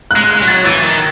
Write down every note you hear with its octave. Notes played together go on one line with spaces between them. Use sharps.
F#6
G#3
F#6
F#3
A6
E3 A6
D#3